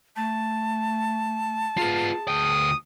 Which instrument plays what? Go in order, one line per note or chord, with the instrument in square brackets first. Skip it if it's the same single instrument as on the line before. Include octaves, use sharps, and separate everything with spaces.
[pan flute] A3 [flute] A5
[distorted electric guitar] B3 F4 [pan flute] G#4
[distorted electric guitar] D2 G5 [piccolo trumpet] D#6